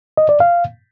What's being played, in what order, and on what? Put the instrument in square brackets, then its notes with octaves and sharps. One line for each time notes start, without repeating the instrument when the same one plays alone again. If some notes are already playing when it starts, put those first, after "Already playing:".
[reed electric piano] D#5
D5
F5